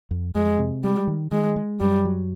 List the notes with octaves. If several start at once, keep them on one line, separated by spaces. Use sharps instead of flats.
F2
F2 G#3
C3
G3 G#3
D#3
D#3 G#3
G#3
F#2 G3
F#3